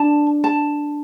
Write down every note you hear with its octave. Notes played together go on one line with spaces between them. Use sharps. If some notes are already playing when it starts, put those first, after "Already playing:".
Already playing: D4 A5
A5